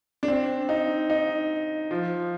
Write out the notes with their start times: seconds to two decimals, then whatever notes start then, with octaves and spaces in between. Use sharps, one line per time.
0.23 D4
0.28 C4
0.69 D#4
1.10 D#4
1.91 F3